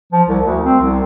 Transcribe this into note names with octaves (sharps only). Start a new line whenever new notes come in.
F3
C2
D2
C4
C2